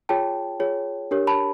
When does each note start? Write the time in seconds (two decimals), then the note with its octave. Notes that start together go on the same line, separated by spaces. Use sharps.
0.09 F4 G#4 C#5 G5 A5
0.60 F4 G#4 C#5
1.11 D4 G4 A#4 C#5
1.27 A5 B5